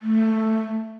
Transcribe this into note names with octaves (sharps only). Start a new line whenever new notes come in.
A3